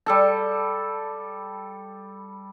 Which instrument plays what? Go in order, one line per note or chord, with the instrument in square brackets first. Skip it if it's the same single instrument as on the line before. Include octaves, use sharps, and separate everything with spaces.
[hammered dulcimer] G3 A4 A5